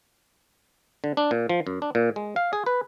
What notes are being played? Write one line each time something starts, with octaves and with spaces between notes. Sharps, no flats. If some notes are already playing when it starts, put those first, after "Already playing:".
D3
D4
A#2
F3
F#2
D4
A#2
G#3
F5
G#4
B4